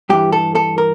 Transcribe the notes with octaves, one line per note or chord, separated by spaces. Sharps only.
G2 E3 G4
A4
A4
A#4